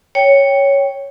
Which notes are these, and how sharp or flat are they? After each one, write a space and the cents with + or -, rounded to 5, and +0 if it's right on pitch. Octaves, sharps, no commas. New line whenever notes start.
C#5 +0 G5 +5